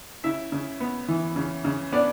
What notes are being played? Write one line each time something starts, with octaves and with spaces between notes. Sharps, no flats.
C#3 E4 E5
C#3
B3
E3
C#3
C#3
B3 D4 D5